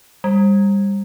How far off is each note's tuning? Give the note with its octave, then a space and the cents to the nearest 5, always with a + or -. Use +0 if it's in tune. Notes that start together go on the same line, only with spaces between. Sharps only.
G3 +25